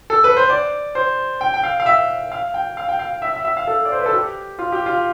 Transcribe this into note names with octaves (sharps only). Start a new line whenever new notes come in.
A4
B4
C5
D5
C5
G5
G5
F5
F5
E5
F5
G5
F5
G5
F5
E5
E5
E5
F5
A4
D5
C5
B4
A4
G4
F4
G4
F4